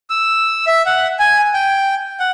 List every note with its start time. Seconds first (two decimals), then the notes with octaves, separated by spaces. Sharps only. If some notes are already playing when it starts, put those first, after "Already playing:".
0.10 E6
0.67 E5
0.86 F#5
1.19 G#5
1.54 G5
2.20 F#5